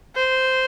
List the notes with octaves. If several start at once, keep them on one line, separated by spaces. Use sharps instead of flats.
C5